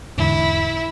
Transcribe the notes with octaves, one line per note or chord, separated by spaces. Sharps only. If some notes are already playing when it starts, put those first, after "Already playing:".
E2 G#2 D3 E4